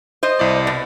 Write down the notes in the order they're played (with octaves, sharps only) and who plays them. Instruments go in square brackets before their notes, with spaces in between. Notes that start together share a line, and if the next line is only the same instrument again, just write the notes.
[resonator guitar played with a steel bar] C5 D#5
[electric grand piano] C2 E4 D5
[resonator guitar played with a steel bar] B2